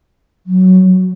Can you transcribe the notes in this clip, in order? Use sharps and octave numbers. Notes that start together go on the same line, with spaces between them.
F#3